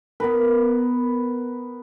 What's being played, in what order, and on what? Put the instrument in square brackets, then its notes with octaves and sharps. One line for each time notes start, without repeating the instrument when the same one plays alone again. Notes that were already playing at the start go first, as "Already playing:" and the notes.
[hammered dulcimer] B3 A#4 B4